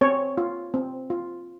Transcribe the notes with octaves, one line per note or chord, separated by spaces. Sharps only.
C4 C#5
F4
C4
F4